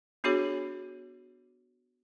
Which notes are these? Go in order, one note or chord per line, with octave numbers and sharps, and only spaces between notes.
B3 D4 F#4 G#4 C#5